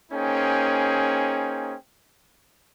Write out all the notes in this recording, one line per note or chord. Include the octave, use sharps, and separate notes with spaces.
A#3 C#4 D#4 G#4 C5 G5